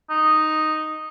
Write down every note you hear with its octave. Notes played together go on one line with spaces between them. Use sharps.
D#4